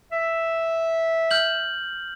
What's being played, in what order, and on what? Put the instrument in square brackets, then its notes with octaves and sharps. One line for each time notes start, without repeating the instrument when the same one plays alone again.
[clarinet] E5
[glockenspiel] F6 G6 F#7